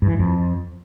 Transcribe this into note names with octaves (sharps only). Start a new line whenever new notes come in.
G2
E3
G#2
F2